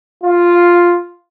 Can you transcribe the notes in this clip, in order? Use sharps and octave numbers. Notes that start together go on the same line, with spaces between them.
F4